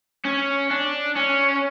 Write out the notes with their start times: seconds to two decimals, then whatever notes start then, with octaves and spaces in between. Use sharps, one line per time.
0.25 C#4
0.71 D4
1.16 C#4